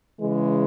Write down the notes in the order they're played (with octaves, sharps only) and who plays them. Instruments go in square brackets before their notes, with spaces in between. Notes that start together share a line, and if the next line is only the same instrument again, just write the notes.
[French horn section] C#3 E3 G#3